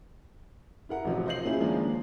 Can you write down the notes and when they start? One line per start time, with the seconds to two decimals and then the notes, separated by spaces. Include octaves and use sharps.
0.89 E4 A#4 F#5
1.05 A1 C3 F3 F#3
1.26 F4 C5 D#5 G6 C7 F#7
1.44 F#3 A#3 C#4 E4 F4 G#4
1.61 D#2 F3 G#3 A#3 D4 D#4